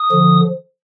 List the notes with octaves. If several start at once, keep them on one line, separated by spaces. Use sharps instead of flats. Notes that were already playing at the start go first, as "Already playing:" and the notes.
Already playing: D#6
D3 F3